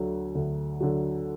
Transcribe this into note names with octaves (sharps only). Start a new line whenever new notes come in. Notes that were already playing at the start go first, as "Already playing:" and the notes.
Already playing: D2 D3 F#3
D2
D3 F#3